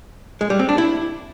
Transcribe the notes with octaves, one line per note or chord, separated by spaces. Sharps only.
G#3
G3
C4
D4
E4